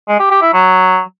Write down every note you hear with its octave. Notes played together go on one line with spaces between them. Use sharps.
G#3
G4
G4
E4
F#3